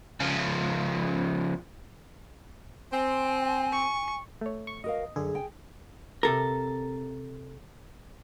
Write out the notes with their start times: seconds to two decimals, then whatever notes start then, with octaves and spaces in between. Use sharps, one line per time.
0.20 C#3 F3
2.92 C4 G#5
3.72 C#6
4.41 A3 C#5
4.67 C#6
4.84 F#4 A#4 D#5 F5
5.16 F#2 D3 G#4
5.35 G5 G#5
6.23 C3 A4 A#4